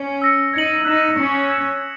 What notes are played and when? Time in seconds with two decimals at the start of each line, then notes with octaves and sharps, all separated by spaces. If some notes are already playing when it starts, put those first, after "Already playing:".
Already playing: C#4
0.22 E6 A#6 C#7
0.53 D#4 G#6 C#7 F#7
0.85 D#4 F#6 B6 E7
1.17 C#4 D#6 A#6 C#7
1.49 E6 G#6 C#7 E7
1.81 G#6 B6